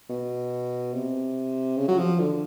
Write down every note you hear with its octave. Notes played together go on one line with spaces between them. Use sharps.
B2
C3
C#3
F#3
F3
D3